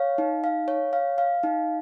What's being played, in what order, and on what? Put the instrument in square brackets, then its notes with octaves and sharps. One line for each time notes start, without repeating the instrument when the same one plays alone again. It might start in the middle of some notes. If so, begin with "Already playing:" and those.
Already playing: [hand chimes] C#5 F5
D#4
F5
C#5
F5
F5
D#4